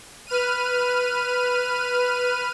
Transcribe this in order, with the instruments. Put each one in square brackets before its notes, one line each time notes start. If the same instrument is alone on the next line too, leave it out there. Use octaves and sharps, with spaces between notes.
[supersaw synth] B4 F6 D#7